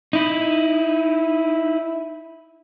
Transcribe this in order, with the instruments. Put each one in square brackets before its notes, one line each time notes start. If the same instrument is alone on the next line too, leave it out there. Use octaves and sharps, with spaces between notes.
[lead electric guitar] D#4 E4